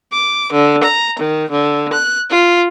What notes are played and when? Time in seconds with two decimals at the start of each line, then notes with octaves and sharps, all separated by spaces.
0.12 D6
0.51 D3
0.83 A#5
1.18 D#3
1.50 D3
1.92 F#6
2.30 F4